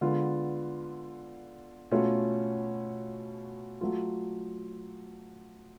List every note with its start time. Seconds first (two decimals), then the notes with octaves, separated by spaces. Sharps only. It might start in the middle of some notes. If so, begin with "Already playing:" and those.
0.01 D3 G#3 B3 F4
1.91 B2 A3 C#4 F4
3.81 F#3 A3 F4